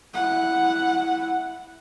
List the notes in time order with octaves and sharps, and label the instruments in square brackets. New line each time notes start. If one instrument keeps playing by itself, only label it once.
[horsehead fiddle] E4 F#5